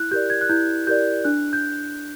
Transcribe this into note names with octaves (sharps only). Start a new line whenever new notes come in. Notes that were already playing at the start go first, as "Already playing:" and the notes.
Already playing: E4 F#6
G4 A#4 D5 G6
G#6
F#6
E4 G6
G4 A#4 D5 G6
D4 F#6
G6